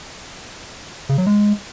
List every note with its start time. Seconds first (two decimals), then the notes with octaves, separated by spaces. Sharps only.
1.09 C#3
1.18 F#3
1.27 G#3